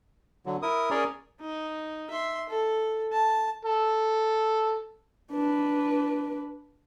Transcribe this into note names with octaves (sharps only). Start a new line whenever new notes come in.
D3 F#3
E4 A#4 D#6
C#4 G#4 A#4 C#5 D5
D#4
E5 C6
A4
A5
A4
D4 B4